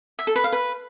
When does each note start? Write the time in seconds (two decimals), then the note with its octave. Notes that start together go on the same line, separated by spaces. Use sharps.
0.19 E5
0.27 A4
0.36 B4
0.44 F5
0.53 B4